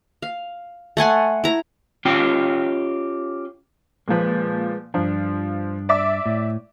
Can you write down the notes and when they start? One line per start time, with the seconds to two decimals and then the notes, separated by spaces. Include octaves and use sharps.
0.22 F5
0.97 A3 F#5 G#5 C6
1.44 E4 A#5
2.05 C#4 F4 G4 G5
4.08 A#2 F3 G#3 B4
4.94 G2 F3 D4
5.89 D5 E5 D6
6.26 A2